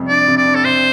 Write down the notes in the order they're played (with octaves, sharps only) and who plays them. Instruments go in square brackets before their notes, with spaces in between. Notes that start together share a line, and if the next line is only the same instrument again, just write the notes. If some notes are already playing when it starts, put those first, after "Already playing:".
Already playing: [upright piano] F2 C3 G3
[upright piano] D4 [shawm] D5
[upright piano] C3
[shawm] D5
[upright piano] D4
[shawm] A4
[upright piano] C3 [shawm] C5